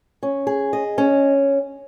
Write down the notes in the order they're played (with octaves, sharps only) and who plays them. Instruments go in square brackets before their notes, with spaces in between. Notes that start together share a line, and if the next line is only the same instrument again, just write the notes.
[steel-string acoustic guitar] C#4
G#4
D#5
C#4